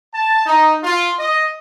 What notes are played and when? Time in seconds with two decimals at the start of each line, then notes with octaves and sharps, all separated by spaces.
0.14 A5
0.46 D#4
0.84 F4
1.19 D#5